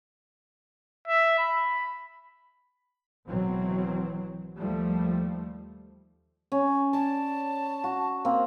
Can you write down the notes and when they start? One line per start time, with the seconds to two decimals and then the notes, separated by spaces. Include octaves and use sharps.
1.08 E5
1.39 B5
3.26 G#1 B2 E3 F#3 C4
4.56 D#2 F3 G3 A3
6.52 C#4
6.93 D5 A5
7.84 F#4
8.25 A#3 C4